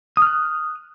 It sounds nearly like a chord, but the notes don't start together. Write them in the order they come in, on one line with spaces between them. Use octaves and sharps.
D#6 F6 F#6